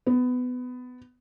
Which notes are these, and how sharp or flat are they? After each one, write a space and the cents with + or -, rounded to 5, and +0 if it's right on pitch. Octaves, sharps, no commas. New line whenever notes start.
B3 +20